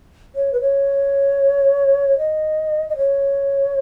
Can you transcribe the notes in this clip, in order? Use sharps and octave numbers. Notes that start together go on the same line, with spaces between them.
C#5
B4
C#5
D#5
D#5
C#5